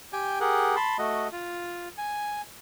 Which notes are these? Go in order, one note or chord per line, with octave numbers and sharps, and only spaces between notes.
G4 G5 G#5
G4 G#4 A#4 F#5
A5 B5 C6
A3 F#4 D#5
F4
G#5